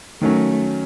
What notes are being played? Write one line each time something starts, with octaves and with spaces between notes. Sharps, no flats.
D#3 F#3 A3 C#4